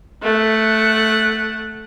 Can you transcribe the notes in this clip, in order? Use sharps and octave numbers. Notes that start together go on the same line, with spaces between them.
A3 F#5